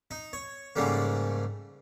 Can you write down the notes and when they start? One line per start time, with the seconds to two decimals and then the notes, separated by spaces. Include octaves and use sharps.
0.11 D#4
0.33 C#5
0.76 G#2 C#3 G3 A3 A#3